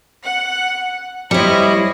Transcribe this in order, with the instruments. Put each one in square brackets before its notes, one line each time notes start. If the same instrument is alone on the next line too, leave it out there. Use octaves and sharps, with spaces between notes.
[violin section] F#5
[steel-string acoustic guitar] G3 E4 [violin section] C5 C#5 D#5